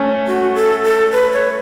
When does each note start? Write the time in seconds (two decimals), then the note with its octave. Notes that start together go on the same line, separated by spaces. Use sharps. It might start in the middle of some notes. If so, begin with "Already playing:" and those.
Already playing: A3 C#4
0.27 F#4
0.55 A4
0.84 A4
1.12 B4
1.33 C#5